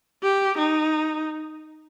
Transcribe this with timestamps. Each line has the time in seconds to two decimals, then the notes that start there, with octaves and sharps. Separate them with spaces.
0.23 G4
0.58 D#4